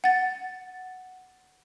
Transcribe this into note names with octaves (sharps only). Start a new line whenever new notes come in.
F#5 A6